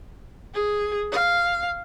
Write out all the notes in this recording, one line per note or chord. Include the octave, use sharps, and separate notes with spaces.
G#4
F5